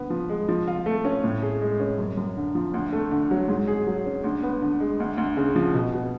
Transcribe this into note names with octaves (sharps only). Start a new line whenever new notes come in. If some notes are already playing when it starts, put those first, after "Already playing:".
Already playing: D3 B3
F3
G#3
F3
F4
A3
C#4
A2
G#4
G#3
C#4
F#2
F#2
D3
F3
D2
A3
D3
F#3
G#2
G#4
F#3
C#4
D2
B3
D3
G#3
D2
D2
C#3
F3
B2
B2